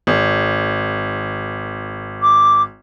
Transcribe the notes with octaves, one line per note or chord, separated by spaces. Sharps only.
G#1
D6